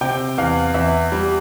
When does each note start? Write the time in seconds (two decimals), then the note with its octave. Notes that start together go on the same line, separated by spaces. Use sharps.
0.01 C3 G5
0.38 E2 F5
0.74 E2 E5
1.12 G3